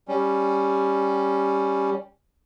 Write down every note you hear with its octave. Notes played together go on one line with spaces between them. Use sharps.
G3 C#4